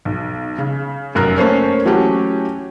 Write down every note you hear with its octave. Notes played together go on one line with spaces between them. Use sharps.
B1
C#3
F1 F#2 A#4 F#6
A3 A#3 C#4 A4 C5 C#5
E3 F#3 A3 C#4 G4